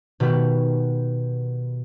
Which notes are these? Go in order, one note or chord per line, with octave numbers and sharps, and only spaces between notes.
B2 D#3 G4 B4